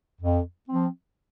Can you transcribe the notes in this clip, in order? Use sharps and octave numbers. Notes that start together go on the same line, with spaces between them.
F2
F3 C4